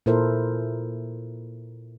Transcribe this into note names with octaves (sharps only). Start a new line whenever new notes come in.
A#2 E4 A4 A#4 C5